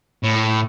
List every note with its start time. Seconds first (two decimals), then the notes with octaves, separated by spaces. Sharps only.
0.24 A2